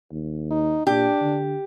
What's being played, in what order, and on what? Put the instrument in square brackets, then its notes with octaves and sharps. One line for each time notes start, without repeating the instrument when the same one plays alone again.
[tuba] D#2
[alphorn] D#4
[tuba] A#2 [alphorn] D4 [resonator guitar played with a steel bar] G4
[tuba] D3